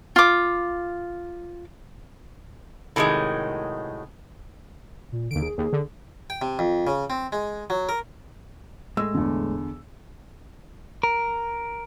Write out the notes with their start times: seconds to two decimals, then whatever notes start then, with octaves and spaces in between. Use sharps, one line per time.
0.16 F4 D6
2.96 A2 C3 D#3 F#3 G#3
5.12 A#2
5.31 D#2 D3 D7
5.43 G#4
5.58 D#2 G#4
5.73 D3
6.30 G5
6.42 C3
6.59 F2
6.87 C#3
7.10 C4
7.32 G#3
7.70 F#3
7.89 A#4
8.97 A2 G#3 E6
9.14 E2 D3
11.03 A#4